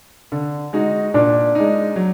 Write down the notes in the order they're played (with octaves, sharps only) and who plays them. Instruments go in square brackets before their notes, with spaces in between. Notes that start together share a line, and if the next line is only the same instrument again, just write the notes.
[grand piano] D3
G#3 D#4 F#4
[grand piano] A#2 [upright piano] D4
[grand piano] G#3 D#4
F#3